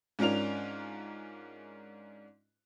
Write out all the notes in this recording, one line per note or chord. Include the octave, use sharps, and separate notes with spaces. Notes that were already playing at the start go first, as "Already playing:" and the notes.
G#2 C#4 D4 F4 A#4 F7